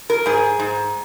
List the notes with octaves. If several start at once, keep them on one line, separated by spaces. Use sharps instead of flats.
A#4
G#2 G#4
G#2